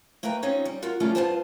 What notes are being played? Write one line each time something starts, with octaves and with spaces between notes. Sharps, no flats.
A3 A#3 B4 G5 A#5
F3 C4 C#4 D#4 C#5
G3
F4 F#4 A#4
D#3 F3 G3 A3 C#4 F4
G2 E3 B3 F4 C5 A5